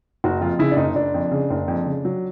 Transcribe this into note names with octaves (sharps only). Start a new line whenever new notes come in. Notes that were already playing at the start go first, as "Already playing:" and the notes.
F#1 F#4
F2 F4
C#3 E4
D4
F#1 D#4
F#1 D4
F2
C#3
F#1
F2
C#3
F#3